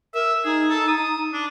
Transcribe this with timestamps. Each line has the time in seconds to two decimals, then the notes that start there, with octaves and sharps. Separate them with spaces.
0.14 A#4 E5
0.45 D#4 G#4
0.70 A4
0.88 D#6
1.33 D4